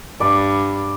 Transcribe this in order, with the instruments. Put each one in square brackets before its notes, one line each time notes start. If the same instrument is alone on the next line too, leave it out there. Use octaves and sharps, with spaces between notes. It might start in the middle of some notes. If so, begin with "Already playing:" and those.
[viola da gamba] G2 [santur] D5 B5